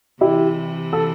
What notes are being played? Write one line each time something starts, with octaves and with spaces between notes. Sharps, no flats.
C3 E3 E4 G4
A4